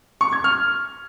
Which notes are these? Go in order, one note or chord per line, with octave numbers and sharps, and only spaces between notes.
C#6
G#6
F6